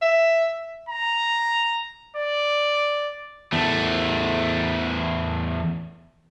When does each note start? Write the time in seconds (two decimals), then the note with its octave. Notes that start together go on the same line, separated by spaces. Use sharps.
0.02 E5
0.89 A#5
2.17 D5
3.52 E2 A3